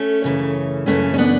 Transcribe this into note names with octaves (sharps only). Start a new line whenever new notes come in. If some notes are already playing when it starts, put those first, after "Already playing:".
Already playing: A3 C#4
F#2 C#3 E3
F#2 C#3 E3 A3 C#4
C#4
B3 D4